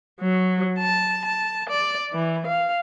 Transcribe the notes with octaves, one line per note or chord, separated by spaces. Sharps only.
F#3
A5
A5
D5
E3
F5